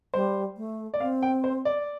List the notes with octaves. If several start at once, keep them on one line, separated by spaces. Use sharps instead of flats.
G3 C5
A3
D5
C4 F5
G5
C5
D5